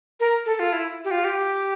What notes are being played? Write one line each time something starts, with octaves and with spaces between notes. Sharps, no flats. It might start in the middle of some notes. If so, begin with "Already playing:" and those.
A#4
A4
F4
E4
G4
F4
G4